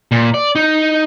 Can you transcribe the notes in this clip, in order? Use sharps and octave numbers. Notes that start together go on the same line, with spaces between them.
A#2
D5
D#4